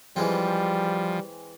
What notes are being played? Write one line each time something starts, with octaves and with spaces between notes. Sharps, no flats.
E3 F3 G3 G#3 C4